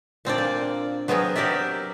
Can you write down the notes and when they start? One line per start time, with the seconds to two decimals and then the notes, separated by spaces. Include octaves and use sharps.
0.25 A#2 C4 D4 D5
0.38 A#3
1.08 F#3 B3 C4 G#4 A#4
1.36 F#3 G4 A#4 D5 E5